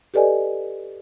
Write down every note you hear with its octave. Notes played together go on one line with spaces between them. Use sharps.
G4 A4 B4 D5 D#5 G#5